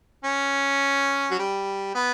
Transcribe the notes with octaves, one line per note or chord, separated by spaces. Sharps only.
C#4
F#3
G3
B3